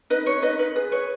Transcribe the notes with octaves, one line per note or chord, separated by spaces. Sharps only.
D#4 B4 D#5
B4 C#5
D#4 B4 D#5
D#4 B4
G#4 B4
B4 C#5